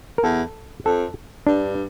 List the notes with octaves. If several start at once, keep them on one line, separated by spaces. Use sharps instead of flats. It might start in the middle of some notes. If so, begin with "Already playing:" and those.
A#4
E2 A4
F2 A4
G2 D4